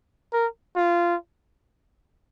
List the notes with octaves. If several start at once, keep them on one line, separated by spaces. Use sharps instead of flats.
A#4
F4